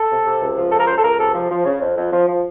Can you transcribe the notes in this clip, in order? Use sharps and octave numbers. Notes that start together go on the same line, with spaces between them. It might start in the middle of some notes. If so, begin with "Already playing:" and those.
Already playing: A4
C3
C3
C#2
F3
C#2 A4
A#4
C#2 C5
A4
C#2 A#4
C3 A4
F3
F3
C#3
F2
F2
F3
F3